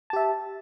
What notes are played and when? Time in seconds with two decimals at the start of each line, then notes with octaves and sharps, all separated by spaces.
0.10 A5
0.13 G4
0.16 E5